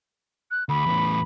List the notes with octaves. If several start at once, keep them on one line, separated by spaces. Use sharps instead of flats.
F#6
D2 B5
E2 A2